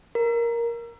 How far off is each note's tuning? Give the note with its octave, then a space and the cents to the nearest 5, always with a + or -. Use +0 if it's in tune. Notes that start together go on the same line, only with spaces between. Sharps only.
A#4 +5